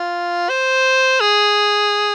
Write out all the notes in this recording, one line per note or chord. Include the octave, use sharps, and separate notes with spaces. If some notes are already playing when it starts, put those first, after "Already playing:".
Already playing: F4
C5
G#4